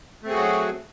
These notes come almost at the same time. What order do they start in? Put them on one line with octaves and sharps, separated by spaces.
A3 C4 G#4 F#4 F#3